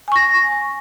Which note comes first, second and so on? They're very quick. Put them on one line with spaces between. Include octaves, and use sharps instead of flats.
G#5 C#6 A#6